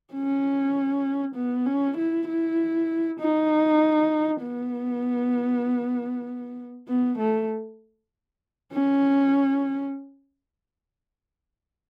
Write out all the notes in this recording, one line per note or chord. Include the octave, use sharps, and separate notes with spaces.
C#4
B3
C#4
E4
E4
D#4
B3
B3
A3
C#4